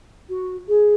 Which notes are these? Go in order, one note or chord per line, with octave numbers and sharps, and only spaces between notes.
F#4
G#4